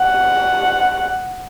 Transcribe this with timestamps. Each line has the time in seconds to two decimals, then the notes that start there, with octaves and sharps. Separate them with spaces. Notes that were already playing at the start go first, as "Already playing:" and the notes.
Already playing: F#5